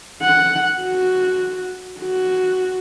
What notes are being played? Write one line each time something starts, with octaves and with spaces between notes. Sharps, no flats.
F#5
F#4
F#4